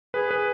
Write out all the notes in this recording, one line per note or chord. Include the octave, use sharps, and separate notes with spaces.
G#4 B4
B4